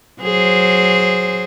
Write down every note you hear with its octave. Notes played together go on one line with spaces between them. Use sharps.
F#3 G#4 C5